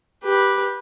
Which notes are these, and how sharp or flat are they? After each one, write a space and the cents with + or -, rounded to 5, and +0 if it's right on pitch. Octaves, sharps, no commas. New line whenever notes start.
G4 +0 B4 -10